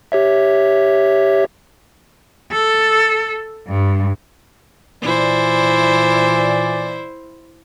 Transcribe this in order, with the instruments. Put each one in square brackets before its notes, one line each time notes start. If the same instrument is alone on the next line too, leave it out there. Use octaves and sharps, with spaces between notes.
[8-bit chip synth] G4 C#5 E5
[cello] A4
G2
[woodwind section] A#2 E3 D5 [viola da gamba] E4 C5